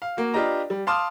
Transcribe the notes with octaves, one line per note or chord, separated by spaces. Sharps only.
F5
A#3 F#4
D4 F4 G4 B4 D#5 A#5
G3
F5 A5 C6 D6 D#6 F6